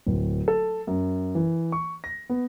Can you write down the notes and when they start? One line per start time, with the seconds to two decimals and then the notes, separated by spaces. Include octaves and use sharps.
0.07 D1
0.48 A4
0.87 F#2
1.35 E3
1.72 C#6
2.04 A#6
2.30 B3